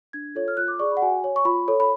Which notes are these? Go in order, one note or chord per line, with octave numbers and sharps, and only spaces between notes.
D4 G#6
F4 A4 C#5
F6
F4 F#6
D6
G#4 D5 C#6
B5
F#5
F#4 G#5
C#5
C#6
F4 B5
A4 C#5
B5